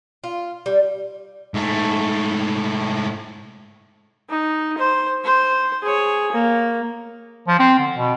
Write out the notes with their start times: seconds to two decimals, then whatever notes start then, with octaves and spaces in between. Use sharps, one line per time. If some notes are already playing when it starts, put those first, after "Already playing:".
0.24 F4
0.66 G3
1.54 G#2 A3
4.30 D#4
4.78 C5
5.25 C5
5.83 G#4 C#5
6.32 A#3
7.48 F3
7.59 C4
7.79 D3
7.96 B2